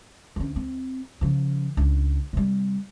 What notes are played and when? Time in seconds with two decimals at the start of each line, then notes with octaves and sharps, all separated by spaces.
0.36 D2 C#4
0.56 C4
1.21 C#3 F3
1.77 C#2 D4
2.33 C3 G3